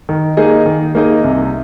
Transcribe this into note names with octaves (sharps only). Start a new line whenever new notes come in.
D#3
A#3 D#4 G#4 D#5
D#3
A#3 D#4 G#4 D#5
C2